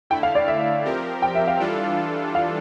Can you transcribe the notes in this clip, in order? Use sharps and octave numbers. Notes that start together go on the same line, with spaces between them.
D3 A3 E4 G5
F5
D5
E5
F3 C4 G4 A#4
G5
E5
F5
E3 G3 D4 F4 A4
F5